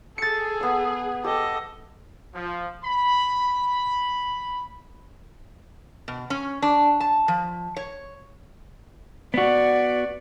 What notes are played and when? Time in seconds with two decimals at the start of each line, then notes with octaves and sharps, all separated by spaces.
0.18 G#4 A4 A6 C#7
0.61 B3 C#6
1.24 G4 A4 D#5
2.34 F3
2.83 B5
6.08 B2
6.30 C#4
6.62 D4
7.00 A5
7.28 F3
7.77 C#5
9.34 B3 F#4 D5